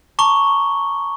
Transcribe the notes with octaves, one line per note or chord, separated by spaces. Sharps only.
A5 A#5 C#6 D6 G7